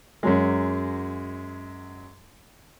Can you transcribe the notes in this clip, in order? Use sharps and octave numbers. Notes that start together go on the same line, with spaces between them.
F#2 F#3 G#3